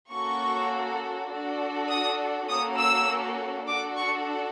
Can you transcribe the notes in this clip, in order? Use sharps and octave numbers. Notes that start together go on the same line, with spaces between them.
A#3 C#4 F#4 A4 C#6
D4 F#4 A4
D#6
A#3 C#4 F#4 A4 D#6
E6
D4 F#4 A4 D6
C#6